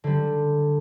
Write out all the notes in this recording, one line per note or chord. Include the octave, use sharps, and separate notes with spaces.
D3 G3